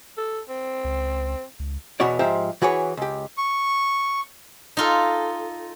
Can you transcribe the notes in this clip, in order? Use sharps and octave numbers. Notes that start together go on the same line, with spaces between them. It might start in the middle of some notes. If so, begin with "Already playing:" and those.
A4
C4
C#2
C#2
E2 B2 B3 F#4 C#5 D5
G#2 F3 G4 C5 E5
E3 F#4 G#4 B4 C#5
C#2 G4
C#6
D#4 F4 A4